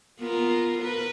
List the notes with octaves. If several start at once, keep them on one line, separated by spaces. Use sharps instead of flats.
B3 F4 A#4
A#4 B4